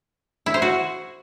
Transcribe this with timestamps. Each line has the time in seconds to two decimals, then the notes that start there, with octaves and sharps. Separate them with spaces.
0.46 E4
0.54 C5
0.62 F#4